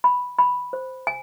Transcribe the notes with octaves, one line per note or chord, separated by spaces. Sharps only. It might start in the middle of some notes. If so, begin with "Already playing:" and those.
B5
B5
C5
G#5